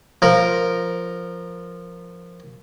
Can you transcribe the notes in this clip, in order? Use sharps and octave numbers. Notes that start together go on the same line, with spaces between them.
F3 A#4